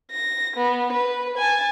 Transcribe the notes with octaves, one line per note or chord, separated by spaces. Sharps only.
A#6
B3
B4
G#5 A5